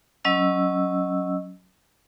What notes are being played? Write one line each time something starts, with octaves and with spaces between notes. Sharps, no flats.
F#3 C#4 D#5 E6